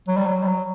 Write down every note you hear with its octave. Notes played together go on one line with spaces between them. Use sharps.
F#3
G3
F#3
G3
F#3